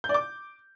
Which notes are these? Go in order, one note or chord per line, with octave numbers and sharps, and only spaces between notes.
G6
D5
D6